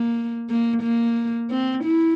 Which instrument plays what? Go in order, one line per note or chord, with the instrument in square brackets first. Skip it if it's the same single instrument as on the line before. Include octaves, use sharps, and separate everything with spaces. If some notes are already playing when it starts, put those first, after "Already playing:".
Already playing: [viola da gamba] A#3
A#3
A#3
C4
E4